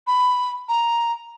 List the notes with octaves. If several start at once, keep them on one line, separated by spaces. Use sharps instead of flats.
B5
A#5